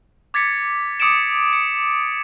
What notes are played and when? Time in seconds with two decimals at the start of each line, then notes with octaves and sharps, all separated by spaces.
0.34 D6 G#6 A6 B6 C#7
1.00 D6 D#6 C#7 D7 E7
1.53 C#7